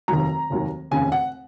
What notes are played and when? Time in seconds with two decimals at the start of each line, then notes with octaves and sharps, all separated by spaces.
0.08 F1 D#2 D#3 F#3 A#5
0.50 F1 D#2 D#3 F#3
0.91 F1 D#2 C#3 G#5
1.12 F#5